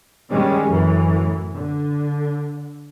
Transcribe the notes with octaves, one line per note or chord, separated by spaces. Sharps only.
D#3 G3 G#3 C#4
F#2 A2 E3
D3